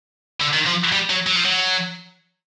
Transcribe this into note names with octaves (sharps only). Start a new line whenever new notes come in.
D3
D#3
F3
G3
F#3
F#3
F3
F#3